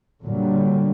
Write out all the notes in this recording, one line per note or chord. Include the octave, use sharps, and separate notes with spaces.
A#2 D3 F#3 G3